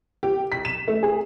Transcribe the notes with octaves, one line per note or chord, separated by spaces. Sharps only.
G4
B6
E7
A3
G#4